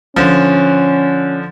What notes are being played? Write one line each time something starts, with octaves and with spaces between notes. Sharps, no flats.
D3 F3 C#4